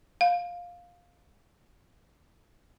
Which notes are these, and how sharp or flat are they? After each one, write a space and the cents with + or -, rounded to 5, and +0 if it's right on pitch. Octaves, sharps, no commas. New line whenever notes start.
F5 +10